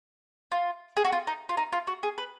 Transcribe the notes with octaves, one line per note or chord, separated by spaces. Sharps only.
F4
G#4
F#4
F4
D#4
F4
D#4
F4
F#4
G#4
B4